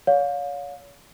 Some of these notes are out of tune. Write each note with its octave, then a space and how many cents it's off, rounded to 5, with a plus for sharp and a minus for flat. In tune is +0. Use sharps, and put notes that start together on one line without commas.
C#5 +35 F5 +30